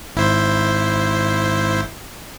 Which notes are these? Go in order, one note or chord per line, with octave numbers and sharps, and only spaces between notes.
G#1 E4 C5